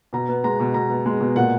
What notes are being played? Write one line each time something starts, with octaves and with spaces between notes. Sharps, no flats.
B2 A#5
B3
G#3 A#5
B2
B2 A#5
B3
G#3
B2
A#2 F#5